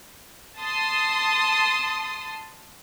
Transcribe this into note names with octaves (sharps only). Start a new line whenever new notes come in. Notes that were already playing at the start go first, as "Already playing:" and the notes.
A5 C6 D#6